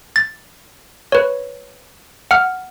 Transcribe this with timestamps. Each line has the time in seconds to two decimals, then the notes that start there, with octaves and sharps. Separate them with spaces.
0.16 A6
1.12 B4 C#5
2.31 F#5 F6